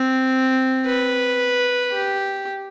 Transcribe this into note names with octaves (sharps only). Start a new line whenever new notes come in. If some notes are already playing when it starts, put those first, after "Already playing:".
Already playing: C4
B4
G4